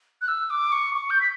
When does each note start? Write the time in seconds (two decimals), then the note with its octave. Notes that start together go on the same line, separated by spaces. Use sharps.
0.22 F#6
0.28 E6
0.50 D6
0.72 C#6
0.95 C#6
1.10 G6
1.21 B6